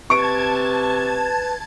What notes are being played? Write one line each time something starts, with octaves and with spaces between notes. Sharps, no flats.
C3 B4 A5 C#6 G#6 D7